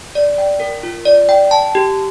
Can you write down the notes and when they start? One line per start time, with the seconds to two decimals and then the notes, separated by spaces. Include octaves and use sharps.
0.15 D5
0.38 G5
0.60 A#4
0.83 F4
1.05 D5
1.29 G5
1.51 A5
1.75 G4